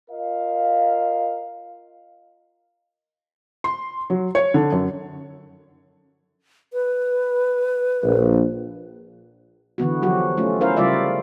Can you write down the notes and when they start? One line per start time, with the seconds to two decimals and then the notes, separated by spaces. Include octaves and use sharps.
0.11 F4 A#4 D#5 F5
3.64 C6
4.10 F#3
4.35 C#5
4.54 D3
4.72 F#2
6.73 B4
8.02 A#1
9.78 D3 E3 B3 F#4
10.02 F3 F#3 F#4 G4
10.37 A3 C#4 F4
10.61 C#4 E4 A#4 C5 F5
10.77 C#3 G3 E4 F4 D5 E5